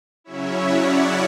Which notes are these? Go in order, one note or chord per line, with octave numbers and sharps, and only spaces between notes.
C#3 F#3 C#4 E4 C#5 E5
D5 F#5